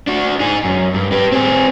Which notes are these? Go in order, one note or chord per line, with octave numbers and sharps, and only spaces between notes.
D4 F#4
D#4 G#4
F#2
G2
G4 B4
C4 G#4